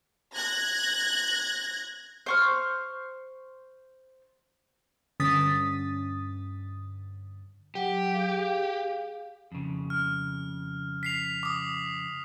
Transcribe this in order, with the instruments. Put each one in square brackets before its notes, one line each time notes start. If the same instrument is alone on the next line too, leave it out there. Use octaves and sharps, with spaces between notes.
[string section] F#6 G#6 A#6
[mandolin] C5 C#6 F6
[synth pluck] G2 D3 C#4 D#6 A6 B6
[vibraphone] F#3 F#5 [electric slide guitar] G4
[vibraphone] G#4 F5
[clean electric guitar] F2 C#3
[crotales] F6
B6 C7 F7
D6 D#6